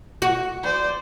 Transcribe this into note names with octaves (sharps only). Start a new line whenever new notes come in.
F#4
C5 D5